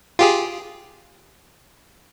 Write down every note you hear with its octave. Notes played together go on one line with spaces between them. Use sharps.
F4 G4 G#4